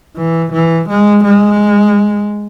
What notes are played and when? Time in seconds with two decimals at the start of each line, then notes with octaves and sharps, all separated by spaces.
0.17 E3
0.53 E3
0.89 G#3
1.24 G#3